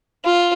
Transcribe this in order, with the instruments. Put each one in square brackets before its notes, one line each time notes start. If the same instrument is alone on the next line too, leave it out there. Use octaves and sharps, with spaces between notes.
[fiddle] F4